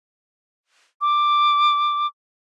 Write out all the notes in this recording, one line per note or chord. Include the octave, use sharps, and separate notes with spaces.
D6